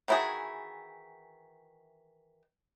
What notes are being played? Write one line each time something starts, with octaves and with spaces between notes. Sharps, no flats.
D#3 E3 E4 F#4 G#4